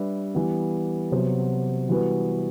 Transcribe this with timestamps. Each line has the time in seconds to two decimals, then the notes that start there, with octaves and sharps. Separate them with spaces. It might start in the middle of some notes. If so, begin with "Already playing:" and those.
Already playing: G3 D4 G4 B4 E5
0.34 E3 G3 B3
1.12 C3 F#3 B3 F#4 C5
1.89 E3 G3 B3 F#4 B4